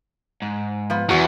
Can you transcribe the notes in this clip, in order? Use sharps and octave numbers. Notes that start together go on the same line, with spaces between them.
G#2
F3 B3
E2 E3 F#4 A#5